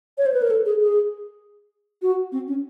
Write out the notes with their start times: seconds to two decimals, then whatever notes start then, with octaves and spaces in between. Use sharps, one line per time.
0.18 C#5
0.26 C5
0.34 B4
0.42 A#4
0.50 A4
0.66 G#4
0.80 G#4
2.02 F#4
2.32 C4
2.48 C#4